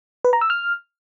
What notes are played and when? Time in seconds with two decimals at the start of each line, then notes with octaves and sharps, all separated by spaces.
0.25 B4
0.33 A#5
0.41 E6
0.50 F6